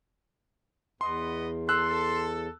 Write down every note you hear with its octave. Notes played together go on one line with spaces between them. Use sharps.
E2 B3 B4 D#5 C6
A4 C6 E6 F#6